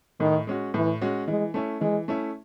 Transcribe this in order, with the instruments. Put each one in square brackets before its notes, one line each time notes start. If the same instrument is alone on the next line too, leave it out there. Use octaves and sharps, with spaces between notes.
[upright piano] A2 [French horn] D#3
[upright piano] G#3 C#4 F#4
[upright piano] A2 [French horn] E3
[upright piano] G#3 C#4 F#4
[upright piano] E3 [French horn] G#3
[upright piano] A3 C#4 E4
[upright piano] E3 [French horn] G#3
[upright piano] A3 C#4 E4